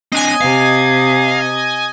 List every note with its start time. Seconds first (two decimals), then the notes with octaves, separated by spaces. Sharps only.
0.12 C4 D4 D#5 G#5
0.41 C3 F5